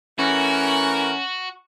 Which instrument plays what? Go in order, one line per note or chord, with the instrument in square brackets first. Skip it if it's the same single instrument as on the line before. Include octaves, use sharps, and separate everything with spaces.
[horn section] E3 A3 A#4 [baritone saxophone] C#4 [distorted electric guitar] F#4